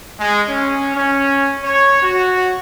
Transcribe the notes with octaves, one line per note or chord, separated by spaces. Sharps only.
G#3
C#4
C#4
C#5
F#4